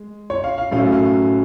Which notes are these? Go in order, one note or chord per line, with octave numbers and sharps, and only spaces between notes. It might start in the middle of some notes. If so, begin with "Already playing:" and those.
Already playing: G#3
C#5
F5
F5
A2 F#3 A3 C#4 F5
F5